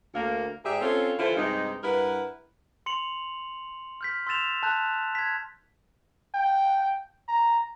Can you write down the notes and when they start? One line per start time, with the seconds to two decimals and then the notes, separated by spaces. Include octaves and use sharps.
0.15 D2 A#3
0.65 G#2 G4 G#4 D5 E5
0.81 C4 C#4 F4 A4 C#5
1.19 D3 E3 E4 F4 C5
1.37 G2 C3 G#3 D#4
1.83 G2 E4 A#4 B4 F#5
2.86 C6 C#7 F7 F#7
4.01 F6 G6 B6
4.27 C6 E6 G6 A6 E7 F7
4.63 A5 F#6 G6
5.15 G#6 B6
6.35 G5
7.28 A#5